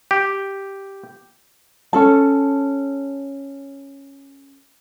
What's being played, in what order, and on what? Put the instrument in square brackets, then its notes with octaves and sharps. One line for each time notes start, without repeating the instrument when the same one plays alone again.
[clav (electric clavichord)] G4
[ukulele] C#4 A4 A5